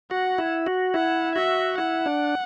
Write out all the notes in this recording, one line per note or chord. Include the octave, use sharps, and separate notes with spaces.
F#4 F#5
E4
F#4
E4 F#5
F#4 E5
E4 F#5
D4